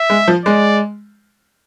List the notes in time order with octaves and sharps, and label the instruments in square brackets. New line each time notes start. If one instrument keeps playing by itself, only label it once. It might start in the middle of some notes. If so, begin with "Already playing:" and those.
Already playing: [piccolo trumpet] E5
[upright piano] G#3
F3
[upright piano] G#3 [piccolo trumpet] D5